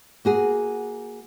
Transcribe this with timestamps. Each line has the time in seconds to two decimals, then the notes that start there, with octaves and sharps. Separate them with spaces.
0.25 A#3 F#4 G#4